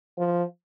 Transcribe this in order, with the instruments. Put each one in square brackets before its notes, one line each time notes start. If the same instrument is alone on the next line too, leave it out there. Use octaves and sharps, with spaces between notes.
[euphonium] F3